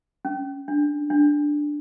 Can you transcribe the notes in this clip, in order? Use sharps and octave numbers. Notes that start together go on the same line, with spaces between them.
C#4
D4
D4